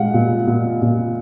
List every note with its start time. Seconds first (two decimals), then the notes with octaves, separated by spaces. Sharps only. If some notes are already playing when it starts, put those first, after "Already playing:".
Already playing: A#2 G#3 F5 F#5
0.14 A#2
0.47 A#2
0.82 A#2